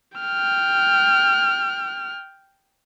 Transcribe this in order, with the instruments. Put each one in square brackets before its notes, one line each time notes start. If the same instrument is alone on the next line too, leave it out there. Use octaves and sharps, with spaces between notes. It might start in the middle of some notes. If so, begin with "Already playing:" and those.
[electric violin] G5 F6